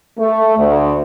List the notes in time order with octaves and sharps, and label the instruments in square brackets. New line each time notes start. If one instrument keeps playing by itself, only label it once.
[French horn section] A3
D2